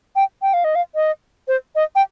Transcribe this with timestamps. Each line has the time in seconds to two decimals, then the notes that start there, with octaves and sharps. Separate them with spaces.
0.16 G5
0.42 G5
0.53 F5
0.64 D#5
0.75 F5
0.95 D#5
1.48 C5
1.75 D#5
1.95 G5